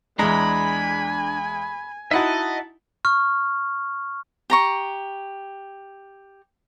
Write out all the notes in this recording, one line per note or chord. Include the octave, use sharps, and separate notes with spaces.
E2 G#3 D4 G#5 A#5 B5
D#4 E4 F#4 D#5 E5 F#5 A5
C#6 F6
G4 A#5 C#6